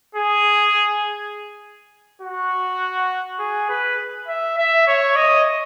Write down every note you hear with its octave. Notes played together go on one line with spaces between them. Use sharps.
G#4
F#4
G#4
B4
E5
E5
C#5
D#5